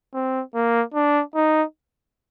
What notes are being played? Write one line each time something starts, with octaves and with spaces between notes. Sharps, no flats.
C4
A#3
D4
D#4